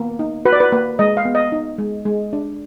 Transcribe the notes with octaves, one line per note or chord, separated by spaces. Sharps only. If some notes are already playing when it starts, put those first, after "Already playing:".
Already playing: A#3 B3
D#4
F#4 B4
D5
B4
A#3 B4
G#3 D#5
F5
B3
D#5
D#4
G#3
G#3
D4